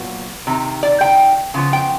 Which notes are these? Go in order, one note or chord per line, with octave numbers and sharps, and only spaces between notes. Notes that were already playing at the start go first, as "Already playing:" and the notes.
Already playing: A#2 F#3 B3
C3 D#3
D5
G5
C#3 F3 B3
G5